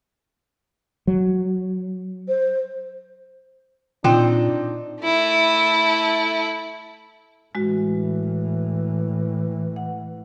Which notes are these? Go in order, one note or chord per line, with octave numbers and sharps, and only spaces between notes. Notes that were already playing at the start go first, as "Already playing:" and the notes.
F#3
C5
A#2 C4 D4 D#4 F4 G5
A3 E4
A2 E3 G#3 F#4
F#5